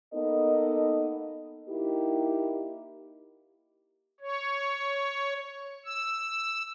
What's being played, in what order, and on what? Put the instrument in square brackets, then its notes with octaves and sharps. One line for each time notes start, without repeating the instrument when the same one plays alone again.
[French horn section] A#3 B3 D#4 A4 D#5
A#3 D#4 E4 G4
[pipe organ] C#5
E6